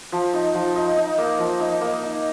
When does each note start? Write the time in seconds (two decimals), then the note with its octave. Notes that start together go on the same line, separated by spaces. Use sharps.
0.12 F3
0.33 D#4
0.55 F3
0.76 D#4
0.97 D#4
1.18 A#3
1.39 F3
1.60 D#4
1.81 A#3
2.03 D#4